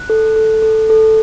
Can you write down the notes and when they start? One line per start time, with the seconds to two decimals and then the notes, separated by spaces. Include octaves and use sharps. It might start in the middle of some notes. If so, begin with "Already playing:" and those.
Already playing: F#6
0.10 A4
0.36 A4
0.62 A4
0.90 A4